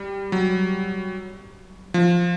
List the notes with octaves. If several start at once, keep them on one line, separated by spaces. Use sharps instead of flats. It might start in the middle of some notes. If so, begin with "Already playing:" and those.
Already playing: G3
F#3
F3